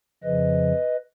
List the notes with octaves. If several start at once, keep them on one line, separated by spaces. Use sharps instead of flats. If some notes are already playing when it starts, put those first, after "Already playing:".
F2 C#3 F3 B4 D#5